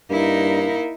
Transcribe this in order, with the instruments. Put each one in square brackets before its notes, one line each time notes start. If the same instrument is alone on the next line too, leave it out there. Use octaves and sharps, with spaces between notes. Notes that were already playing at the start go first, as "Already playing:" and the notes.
[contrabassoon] G2 [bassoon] A#3 [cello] D#4 E4